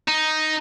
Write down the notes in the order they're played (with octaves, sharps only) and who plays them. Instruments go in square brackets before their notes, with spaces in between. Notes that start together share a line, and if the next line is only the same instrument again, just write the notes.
[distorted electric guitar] D#4